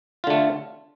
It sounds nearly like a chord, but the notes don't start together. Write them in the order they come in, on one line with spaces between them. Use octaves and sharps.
F4 D3 A3